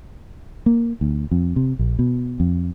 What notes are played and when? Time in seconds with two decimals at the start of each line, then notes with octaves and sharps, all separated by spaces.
0.66 A#3
1.01 D2
1.31 F2
1.56 C3
1.79 A#1
1.99 B2
2.40 F2